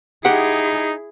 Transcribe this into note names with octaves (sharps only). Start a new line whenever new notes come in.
D#4 E4 G4 G#4 F#5